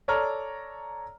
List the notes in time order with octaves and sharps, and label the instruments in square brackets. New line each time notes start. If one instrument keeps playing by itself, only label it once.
[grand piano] A4 C#5 D5 A#5 F6